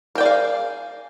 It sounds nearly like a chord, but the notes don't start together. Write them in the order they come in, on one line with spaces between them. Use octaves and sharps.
A#4 G5 D5 G#4 F5